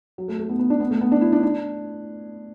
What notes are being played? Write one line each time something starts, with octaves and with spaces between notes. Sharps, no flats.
F#3
A3
A3
B3
B3
D4
B3
A3
B3
D4
E4
D4
D4